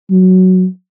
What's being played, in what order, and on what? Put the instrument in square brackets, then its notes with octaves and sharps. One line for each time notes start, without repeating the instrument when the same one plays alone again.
[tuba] F#3